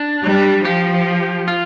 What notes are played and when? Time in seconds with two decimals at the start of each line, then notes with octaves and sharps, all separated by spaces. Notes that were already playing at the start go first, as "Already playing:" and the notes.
Already playing: D4
0.24 G3
0.65 F3 G4
1.48 F4